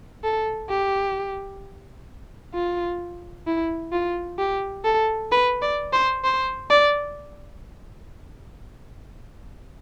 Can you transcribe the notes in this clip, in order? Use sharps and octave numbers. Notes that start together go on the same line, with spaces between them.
A4
G4
F4
E4
F4
G4
A4
B4
D5
C5
C5
D5